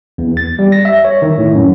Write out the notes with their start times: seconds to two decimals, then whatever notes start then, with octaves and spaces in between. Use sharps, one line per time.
0.18 E2
0.37 A6
0.59 G3
0.72 A#6
0.85 E5
1.05 C#5
1.22 D#3
1.38 A2
1.55 F#2